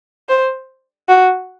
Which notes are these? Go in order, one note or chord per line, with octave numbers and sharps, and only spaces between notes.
C5
F#4